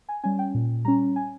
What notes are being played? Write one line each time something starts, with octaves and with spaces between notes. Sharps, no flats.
G#5
G3 C#4 G#5
G5
A#2
G3 C#4 A#5
G#5